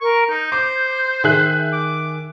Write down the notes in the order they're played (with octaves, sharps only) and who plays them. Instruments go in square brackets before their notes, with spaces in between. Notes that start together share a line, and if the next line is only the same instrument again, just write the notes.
[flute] A#4 [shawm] C#6
[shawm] D#4 [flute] G6
[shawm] C5 [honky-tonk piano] D6
[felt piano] D#3 [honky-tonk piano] G#4 E5 F#6
[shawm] D6